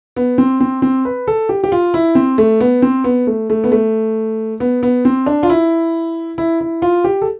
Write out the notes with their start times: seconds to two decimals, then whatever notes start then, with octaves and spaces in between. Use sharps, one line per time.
0.16 B3
0.38 C4
0.60 C4
0.82 C4
1.05 B4
1.27 A4
1.49 G4
1.64 G4
1.72 F4
1.94 E4
2.15 C4
2.38 A3
2.60 B3
2.82 C4
3.04 B3
3.27 A3
3.50 A3
3.64 B3
3.72 A3
4.60 B3
4.83 B3
5.05 C4
5.26 D4
5.43 F4
5.50 E4
6.38 E4
6.61 E4
6.82 F4
7.04 G4
7.22 A4